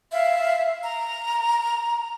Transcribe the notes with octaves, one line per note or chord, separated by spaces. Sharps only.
E5 F5
A#5